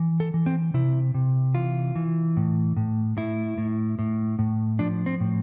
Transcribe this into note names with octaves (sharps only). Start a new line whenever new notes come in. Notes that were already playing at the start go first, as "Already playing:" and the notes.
Already playing: E3
A4
E3
C4
C3 E4
C3
E3 F4
E3
A2
A2
A2 E4
A2
A2
A2
F3 D4
C4
A2